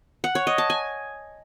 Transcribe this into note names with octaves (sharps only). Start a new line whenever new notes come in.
F#5
C#5
D#5
A5
G#5